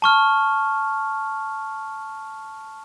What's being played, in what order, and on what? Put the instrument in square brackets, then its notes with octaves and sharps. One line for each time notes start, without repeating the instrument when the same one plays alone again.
[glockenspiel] A5 C#6 F6